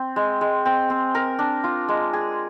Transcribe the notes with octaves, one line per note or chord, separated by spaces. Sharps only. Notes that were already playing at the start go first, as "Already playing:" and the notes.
Already playing: C4
G#3
G#3
C4
C4
A#4
D4
F4
G#3
G#4